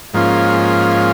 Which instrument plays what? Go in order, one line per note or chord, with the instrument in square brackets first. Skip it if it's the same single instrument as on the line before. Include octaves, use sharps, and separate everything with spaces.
[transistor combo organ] G#2 F3 A#3 C#4 F4